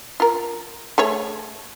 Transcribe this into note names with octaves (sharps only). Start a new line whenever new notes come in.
F4 A#4
A3 G#4 C#5